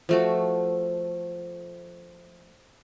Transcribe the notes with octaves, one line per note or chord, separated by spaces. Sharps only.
F3 A3 F#4